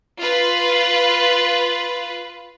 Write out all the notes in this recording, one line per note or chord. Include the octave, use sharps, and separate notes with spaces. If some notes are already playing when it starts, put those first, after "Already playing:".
F4 B4